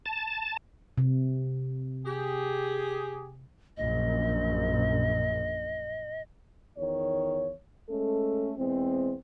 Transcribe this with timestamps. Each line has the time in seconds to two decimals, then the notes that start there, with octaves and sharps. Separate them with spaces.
0.06 A5
0.98 C3
2.06 G4 G#4
3.77 A#1 F#2 D#5
6.78 E2 D#3 C#5
7.90 G#3 A3 C#4 A4
8.57 E2 G#3 C4